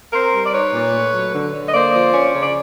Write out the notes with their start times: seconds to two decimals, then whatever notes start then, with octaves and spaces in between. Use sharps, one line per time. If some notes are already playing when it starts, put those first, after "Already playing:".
0.13 C4 A#4 C5
0.32 G3
0.45 D5
0.53 D#4 B4 C#5
0.73 A#2
0.93 A3
1.13 F#3
1.33 D3
1.53 D3
1.67 D#5
1.73 A#3 C5 D5
1.94 F3
2.13 C#4
2.34 C#3
2.42 D5